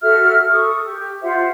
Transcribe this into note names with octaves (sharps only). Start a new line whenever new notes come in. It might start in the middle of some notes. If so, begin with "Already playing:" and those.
F#4 A4 E5 F6
A4 C#6 D#6
G4
F4 C5 E5 F#5